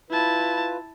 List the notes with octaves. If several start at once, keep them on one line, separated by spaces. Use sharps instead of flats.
E4 F4 B4 A5